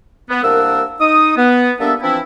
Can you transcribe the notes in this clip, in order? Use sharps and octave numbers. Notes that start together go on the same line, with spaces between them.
B3
C2 A#3 D4 A#4 F#5 E6
D#4 D#6
B3
G3 A#3 B3 D4 A4 E5
E3 F3 C4 D4 E4